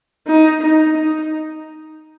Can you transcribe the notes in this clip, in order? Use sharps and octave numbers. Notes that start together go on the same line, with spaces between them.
D#4
D#4
D#4